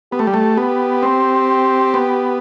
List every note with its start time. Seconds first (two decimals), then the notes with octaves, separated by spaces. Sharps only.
0.12 B3 G4
0.19 A3
0.27 G3
0.34 A3
0.57 B3 G4
1.02 C4
1.94 B3